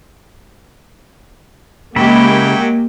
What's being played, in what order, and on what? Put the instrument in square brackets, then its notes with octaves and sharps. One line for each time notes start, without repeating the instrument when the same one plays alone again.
[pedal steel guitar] C#3 E4 B5 [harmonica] F#3 G5 [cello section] G#3 G4 [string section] A#3